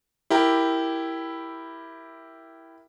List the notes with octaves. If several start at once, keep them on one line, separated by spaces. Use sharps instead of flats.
E4 G4 A#4